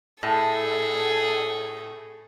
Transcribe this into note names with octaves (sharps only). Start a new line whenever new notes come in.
A2 G#4 A4